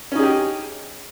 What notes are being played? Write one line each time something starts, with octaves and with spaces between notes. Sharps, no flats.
C#4 D#4 G4 G#4